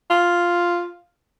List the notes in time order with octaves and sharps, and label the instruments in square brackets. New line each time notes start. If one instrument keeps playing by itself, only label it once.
[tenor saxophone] F4